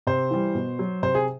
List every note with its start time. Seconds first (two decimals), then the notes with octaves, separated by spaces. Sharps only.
0.07 C3 C5
0.31 E3 G3
0.55 B2
0.79 F#3
1.03 C3 C5
1.15 G#4